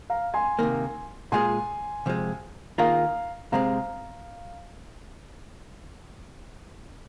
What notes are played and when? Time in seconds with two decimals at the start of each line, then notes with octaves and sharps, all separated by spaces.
0.10 F5 A#5
0.34 G#5 C6
0.59 C3 D#3 A#3
1.32 A#2 G#3 F4 G#4 G#5 C6
2.06 C3 F3 G#3
2.78 D#3 A#3 F4 G#4 F5 A#5
3.52 C3 G#3 C4 F5 A#5